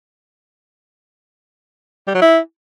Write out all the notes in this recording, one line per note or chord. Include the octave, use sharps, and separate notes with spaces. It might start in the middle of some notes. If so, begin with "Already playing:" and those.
G3
F#3
E4